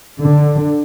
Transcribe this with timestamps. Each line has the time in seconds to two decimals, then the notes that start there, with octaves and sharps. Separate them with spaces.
0.20 D3